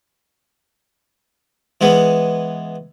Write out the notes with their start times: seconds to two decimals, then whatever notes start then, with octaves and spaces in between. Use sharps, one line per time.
1.81 E3 G#3 B3